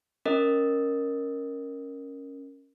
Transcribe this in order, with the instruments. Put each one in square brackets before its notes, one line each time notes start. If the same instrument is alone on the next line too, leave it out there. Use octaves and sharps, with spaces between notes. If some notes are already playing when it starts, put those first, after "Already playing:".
[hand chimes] C#4 A#4 D#5